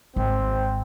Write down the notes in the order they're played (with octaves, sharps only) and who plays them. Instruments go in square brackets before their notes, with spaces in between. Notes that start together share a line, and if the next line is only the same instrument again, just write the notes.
[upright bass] G#1 [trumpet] C4